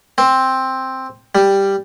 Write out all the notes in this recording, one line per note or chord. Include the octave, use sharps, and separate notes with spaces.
C4
G3